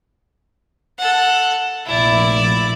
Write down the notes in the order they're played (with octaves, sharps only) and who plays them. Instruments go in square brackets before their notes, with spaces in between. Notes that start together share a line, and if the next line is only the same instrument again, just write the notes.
[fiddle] A4 F#5
[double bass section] F1 A#1 [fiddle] E4 D5